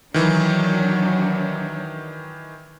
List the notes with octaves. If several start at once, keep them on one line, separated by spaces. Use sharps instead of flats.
D#3 E3 F#3 D4